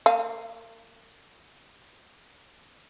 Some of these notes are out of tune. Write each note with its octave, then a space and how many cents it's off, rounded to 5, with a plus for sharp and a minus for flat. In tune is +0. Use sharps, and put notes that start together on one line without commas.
A#3 -40 F5 +0